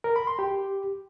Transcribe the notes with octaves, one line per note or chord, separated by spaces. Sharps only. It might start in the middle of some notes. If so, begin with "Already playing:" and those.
A#4
B5
C6
G4